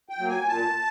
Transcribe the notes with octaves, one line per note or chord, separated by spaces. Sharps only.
G5
F#3 A#3
G#5
A#2 A5